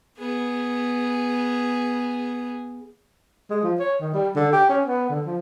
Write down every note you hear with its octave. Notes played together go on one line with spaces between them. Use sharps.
B3 G#4
G#3
F3
C#5
D#3
G3
D3
G4
C#4
B3
D3
F3